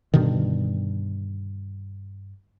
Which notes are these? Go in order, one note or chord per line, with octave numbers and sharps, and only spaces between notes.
G2 B2 D3 D#3